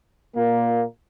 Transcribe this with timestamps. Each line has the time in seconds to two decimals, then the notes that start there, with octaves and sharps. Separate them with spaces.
0.35 A#2 A#3